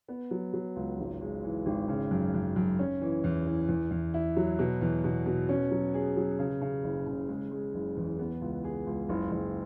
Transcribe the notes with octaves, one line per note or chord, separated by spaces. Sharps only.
B3
F#3
F#3
C#2
G#1
G#3
E3
G#1
C#3
F#2
F#2
F#2
C#4
E3
E2
E3
E2
E2
E4
F#3
B2
E2
B2
B2
C#4
F#3
G#4
F#3
C#3
C#3
F#1
C#3
G#3
G#3
F#1
E2
B3
C#2
G#4
C#2
F#1
F#1